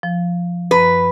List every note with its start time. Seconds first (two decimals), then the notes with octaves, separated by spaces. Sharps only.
0.03 F3
0.71 F#2 F3 B4